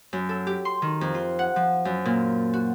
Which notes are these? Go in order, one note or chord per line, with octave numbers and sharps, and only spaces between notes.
F#2
A4
G4
C6
D#3
F2
F4
F#5
F3
F#2
A#2
F#4